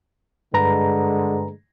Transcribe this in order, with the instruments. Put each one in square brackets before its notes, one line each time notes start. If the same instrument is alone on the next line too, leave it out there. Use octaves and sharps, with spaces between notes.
[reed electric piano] G2 B4 A#5 [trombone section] D3 G#3